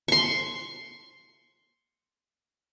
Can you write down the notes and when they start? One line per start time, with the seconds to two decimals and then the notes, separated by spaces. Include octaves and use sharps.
0.08 C6 C#6